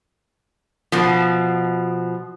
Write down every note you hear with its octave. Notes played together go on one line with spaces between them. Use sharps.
B2 F3